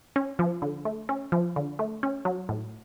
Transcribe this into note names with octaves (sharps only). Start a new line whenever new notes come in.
C#4
F3
D3
A3
C#4
F3
D3
A3
C#4
F#3
A2